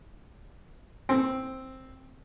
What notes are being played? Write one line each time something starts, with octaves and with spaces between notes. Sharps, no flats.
C4